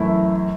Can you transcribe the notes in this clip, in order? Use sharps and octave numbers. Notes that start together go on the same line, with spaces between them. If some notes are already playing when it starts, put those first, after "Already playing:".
Already playing: F#2 E3 A3 E4